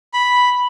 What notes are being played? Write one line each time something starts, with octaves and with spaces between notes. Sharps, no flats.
B5